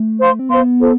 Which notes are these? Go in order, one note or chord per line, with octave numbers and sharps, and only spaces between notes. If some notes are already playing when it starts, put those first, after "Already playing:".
Already playing: A3
C5 F5 C6
C4
B3 C5 F5 C6
F4 A4 C5